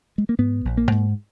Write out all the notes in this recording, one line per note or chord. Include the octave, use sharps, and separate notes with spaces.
G#3
A#3
G#2 B3
A#1
A#3
G#2